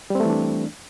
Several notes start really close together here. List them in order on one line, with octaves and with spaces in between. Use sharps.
G3 C4 A3 E3 D4